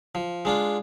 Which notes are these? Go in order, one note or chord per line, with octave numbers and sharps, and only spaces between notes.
F3
G#3 D4 F4